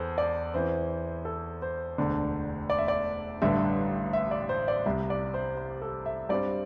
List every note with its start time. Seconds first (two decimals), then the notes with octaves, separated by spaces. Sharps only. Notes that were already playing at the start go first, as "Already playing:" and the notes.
Already playing: E2 A4 C5
0.18 D5
0.54 E2 E3 C4 C5
1.25 A4
1.62 C5
1.98 E1 D2 D3
2.70 D5
2.78 E5
2.88 D5
3.42 A1 G2 D3 E5
4.13 E5
4.31 D5
4.49 C5
4.68 D5
4.86 C2 C3 G3 E5
5.10 D5
5.34 C5
5.57 C5
5.82 A4
6.06 E5
6.29 G2 G3 C4 D5